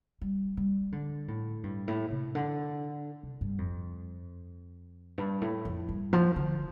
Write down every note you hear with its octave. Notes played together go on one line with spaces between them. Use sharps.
G3
G3
D3
A2
G2
A2
C3
D3
C3
G2
F2
G2
A2
F2
G2
F3
D3